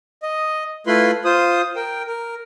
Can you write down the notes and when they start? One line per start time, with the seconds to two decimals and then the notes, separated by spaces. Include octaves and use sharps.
0.23 D#5
0.87 A3 E4 F4 B4 B5 C6
1.25 F4 C5 D#6
1.76 A#4 G5
2.07 A#4